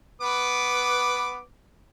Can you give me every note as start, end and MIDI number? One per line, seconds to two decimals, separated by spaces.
0.21 1.39 59
0.21 1.39 71
0.21 1.39 86